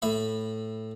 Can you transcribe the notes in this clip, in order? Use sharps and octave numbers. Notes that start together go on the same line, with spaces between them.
A2 E5 B5